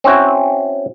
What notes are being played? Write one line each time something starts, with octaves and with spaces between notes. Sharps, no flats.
C4 C#4 E4 F#4